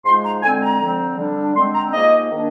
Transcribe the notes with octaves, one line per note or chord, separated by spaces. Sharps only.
G#2 F3 G#3 D#4 C6
A#5
D3 G#3 C4 G#5
A#5
D3 F3 C4
D3 G3 D4
D3 G#3 C4 C6
A#5
G#2 F3 A#3 D#4 D#5
D#3 A#3 D4